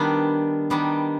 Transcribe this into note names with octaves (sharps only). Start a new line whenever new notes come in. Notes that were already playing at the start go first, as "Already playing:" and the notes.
Already playing: D#3 G3 B3 D4
D#3 G3 B3 D4